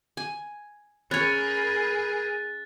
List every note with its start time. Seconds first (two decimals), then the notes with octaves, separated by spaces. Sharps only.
0.17 G#5
1.11 C#4 G#4 A#4 C#5 B5 F#6 A6